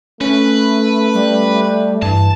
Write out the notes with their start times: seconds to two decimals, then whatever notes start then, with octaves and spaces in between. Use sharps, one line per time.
0.21 A3 C#4 B4
1.14 G3
2.02 G2 E3 A5